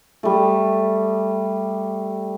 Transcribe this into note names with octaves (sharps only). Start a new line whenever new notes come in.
G3 A3